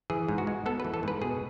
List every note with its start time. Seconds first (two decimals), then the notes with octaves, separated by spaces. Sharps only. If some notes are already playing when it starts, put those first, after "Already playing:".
0.10 E3 G#4
0.28 G#2
0.38 F#4
0.47 G#3
0.66 B3 A4
0.80 E3 B4
0.94 A4
1.03 G#2 B4
1.21 B2 G#4